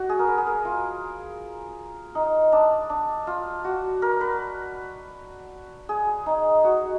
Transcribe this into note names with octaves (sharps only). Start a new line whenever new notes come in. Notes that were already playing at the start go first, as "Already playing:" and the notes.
Already playing: F#4
G#4
A#4
B4
G#4
A#4
F4
D#4
D4
D4
F4
F#4
A#4
B4
G#4
D#4
F#4